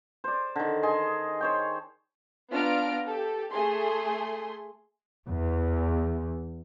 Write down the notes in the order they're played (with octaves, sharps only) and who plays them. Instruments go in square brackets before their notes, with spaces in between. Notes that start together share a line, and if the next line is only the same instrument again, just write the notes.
[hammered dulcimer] C5 D5
D3 D#3
G#4 D#5 A5 C6
C5 C#5 G5
[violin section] B3 D4 F4 A#5 F6 D7
G4 A4
A3 G#4 C6
[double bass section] E2